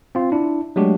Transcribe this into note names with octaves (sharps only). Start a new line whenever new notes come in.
C4 F4
D4 E4
F#3 G#3 A3 D4 F#4 G4